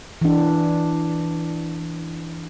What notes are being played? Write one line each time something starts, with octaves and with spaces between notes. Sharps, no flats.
E3 D4